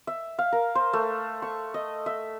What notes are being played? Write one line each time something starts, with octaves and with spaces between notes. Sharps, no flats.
E5
F5
A#4
C5
A3
C#6
D#5
E5